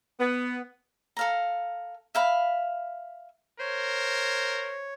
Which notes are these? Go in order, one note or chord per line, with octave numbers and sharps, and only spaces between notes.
B3
A4 F5 A#5
E5 F5 B5
A#4 C5 C#5